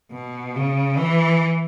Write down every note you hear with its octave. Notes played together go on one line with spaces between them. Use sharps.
B2
C#3
E3